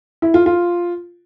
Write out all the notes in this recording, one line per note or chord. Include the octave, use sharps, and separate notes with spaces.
E4
F4
F4